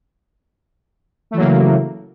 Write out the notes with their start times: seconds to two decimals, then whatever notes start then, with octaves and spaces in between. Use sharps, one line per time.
1.31 A3
1.34 E3
1.37 F#3
1.40 A#3
1.42 C#3